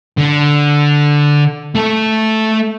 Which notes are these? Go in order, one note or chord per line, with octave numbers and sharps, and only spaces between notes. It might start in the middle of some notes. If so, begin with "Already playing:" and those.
D3
A3 A4